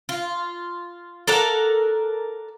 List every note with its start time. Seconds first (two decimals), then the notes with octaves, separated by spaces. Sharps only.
0.09 F4
1.27 A4 A#4 D5 F#5